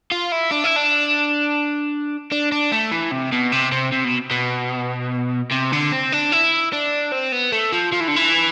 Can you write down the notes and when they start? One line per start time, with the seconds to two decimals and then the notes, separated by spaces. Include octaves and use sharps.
0.12 F4
0.32 E4
0.51 D4
0.64 E4
0.76 D4
2.32 D4
2.52 D4
2.72 A3
2.92 E3
3.12 C3
3.32 B2
3.52 C3
3.72 C3
3.92 C3
4.05 B2
4.31 B2
5.52 C3
5.73 D3
5.92 C4
6.12 D4
6.32 E4
6.73 D4
7.12 C4
7.32 B3
7.52 A3
7.73 F3
7.93 F3
8.00 E3
8.08 D3
8.16 E3